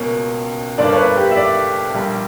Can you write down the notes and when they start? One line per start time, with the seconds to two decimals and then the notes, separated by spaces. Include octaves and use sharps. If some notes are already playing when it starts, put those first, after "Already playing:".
Already playing: C#2 B2 A#3 C#4
0.78 G1 G2 D3 A#3 D4 D5
0.93 C#5
0.97 B4
1.17 G4
1.31 E5
1.37 D5
1.94 A#1 A#2 G3